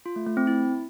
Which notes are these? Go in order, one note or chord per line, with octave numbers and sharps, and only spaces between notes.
F4
A3
A3
C4
E4